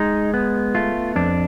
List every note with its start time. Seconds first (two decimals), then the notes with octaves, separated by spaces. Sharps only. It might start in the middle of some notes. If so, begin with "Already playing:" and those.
Already playing: G#3 D#4
0.34 B3
0.75 A3 F4
1.16 F2 D4